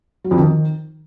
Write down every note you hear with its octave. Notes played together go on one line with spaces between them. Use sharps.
F#3
F2
D#3